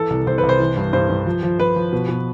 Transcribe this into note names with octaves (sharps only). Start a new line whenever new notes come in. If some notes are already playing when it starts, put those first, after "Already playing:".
Already playing: E3 A4
C2
C2 C5
B4
C2
C5
E3
G2
G2 C5
G2
F3
F3
F3 B4
F3
B2
B2